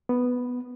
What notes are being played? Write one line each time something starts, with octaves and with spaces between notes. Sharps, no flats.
B3